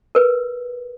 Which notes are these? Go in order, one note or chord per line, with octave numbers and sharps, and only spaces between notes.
A#4 B4